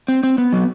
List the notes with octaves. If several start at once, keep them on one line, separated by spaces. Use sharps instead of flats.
C4
C4
B3
F#3